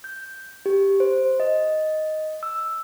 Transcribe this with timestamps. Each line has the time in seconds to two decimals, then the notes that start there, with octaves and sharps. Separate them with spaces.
0.04 G6
0.66 G4
1.00 C5
1.40 D#5
2.43 E6